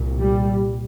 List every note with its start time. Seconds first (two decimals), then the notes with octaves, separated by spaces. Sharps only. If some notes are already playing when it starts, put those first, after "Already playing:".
Already playing: C2 A#2
0.20 G3